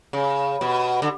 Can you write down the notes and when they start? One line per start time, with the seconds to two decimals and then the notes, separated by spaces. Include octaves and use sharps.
0.13 C#3
0.61 B2
1.02 D3